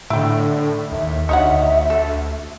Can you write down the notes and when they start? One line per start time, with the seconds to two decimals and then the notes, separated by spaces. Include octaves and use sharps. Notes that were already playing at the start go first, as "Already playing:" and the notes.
0.10 A2 D3 E4 G5
0.92 D#2 E5
1.29 D2 D#4 C#5 F#5
1.90 A4